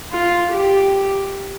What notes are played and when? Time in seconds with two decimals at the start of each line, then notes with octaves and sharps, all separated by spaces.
0.12 F4
0.51 G4